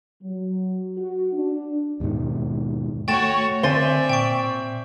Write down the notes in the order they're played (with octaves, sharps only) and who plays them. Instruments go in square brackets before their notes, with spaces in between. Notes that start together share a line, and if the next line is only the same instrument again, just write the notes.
[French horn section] F#3
F#4
D4
[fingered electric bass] D#2 G#2 B2 D#3
[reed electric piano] A3 C#6 [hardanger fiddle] F#4 C#5 [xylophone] G5 A6 E7
[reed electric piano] D3 [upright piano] C4 C5 [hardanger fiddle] D5 E5 [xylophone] G#5 A6 G7
[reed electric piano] A#2 [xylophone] G5 C#6